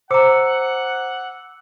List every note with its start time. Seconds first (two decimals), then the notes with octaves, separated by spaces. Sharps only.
0.11 C5 F#5 A#5 D6 E6 C#7